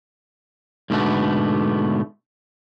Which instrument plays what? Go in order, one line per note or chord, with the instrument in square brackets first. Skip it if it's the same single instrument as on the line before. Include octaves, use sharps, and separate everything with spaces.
[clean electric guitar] G#2 B2 D3 G3 A3 B3